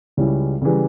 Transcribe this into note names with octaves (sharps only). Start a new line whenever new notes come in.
C#2 C#3 G3 C#4 E4
C#3 E3 G3